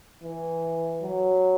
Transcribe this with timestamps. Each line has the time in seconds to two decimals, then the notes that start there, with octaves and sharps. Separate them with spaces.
0.23 E3
1.02 F#3